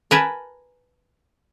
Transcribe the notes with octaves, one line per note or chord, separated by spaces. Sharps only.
A#4 B4 G#5 A5